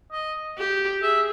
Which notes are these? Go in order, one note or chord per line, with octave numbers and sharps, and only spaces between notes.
D#5
G4
G#4 E5